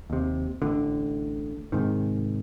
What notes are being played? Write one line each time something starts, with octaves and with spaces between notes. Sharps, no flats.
D#2 C3
A1 A2 D3
G#2 C3 D#3